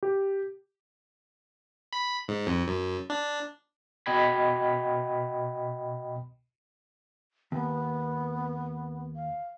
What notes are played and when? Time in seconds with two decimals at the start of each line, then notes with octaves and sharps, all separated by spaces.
0.03 G4
1.93 B5
2.28 G#2
2.47 F2
2.67 F#2
3.10 D4
4.06 B2 D#5 G5 B5 G#6 B6
7.52 D#2 B3
9.16 F5